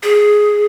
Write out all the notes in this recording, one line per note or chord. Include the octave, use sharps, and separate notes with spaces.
G#4